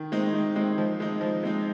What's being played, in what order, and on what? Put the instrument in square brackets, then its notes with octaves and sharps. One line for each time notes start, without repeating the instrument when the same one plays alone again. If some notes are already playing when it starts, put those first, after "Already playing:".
Already playing: [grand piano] D#3
G#3 C4 D#4
D#3
G#3 C4 D#4
F3
G#3 C4 D#4
F3
G#3 C4 D#4